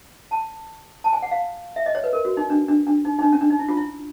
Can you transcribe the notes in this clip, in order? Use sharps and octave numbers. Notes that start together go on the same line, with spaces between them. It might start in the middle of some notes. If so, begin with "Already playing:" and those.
A5
A5
G#5
F#5
F5
E5
D#5
C#5
B4
A#4
F#4
D#4
D4
D4
D4
D#4
D#4
D4
C#4
D4
D#4
E4
F4
E4